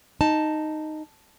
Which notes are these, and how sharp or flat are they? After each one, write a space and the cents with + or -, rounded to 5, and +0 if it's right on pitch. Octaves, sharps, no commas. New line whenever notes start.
D#4 -5 A5 +0